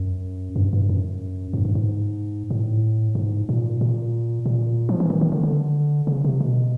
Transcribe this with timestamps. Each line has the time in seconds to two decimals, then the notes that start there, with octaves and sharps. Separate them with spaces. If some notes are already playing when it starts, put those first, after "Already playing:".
Already playing: F#2
0.56 G2
0.73 G2
0.89 F#2
1.53 G#2
1.65 G2
1.75 G#2
2.50 A2
3.15 G#2
3.49 A#2
3.81 A#2
4.46 A#2
4.89 F3
5.00 E3
5.10 D#3
5.21 D#3
5.32 D3
5.43 D3
6.07 C#3
6.24 C3
6.40 B2